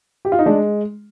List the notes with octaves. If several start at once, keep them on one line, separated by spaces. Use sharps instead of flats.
G4
F4
D#4
G#3 D4